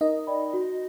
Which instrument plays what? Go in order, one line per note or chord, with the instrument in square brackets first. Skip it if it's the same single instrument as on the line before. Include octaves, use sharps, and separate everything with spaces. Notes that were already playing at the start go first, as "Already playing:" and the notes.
[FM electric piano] D#4 D#5 [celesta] A#4
[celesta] D5 G5 B5
F#4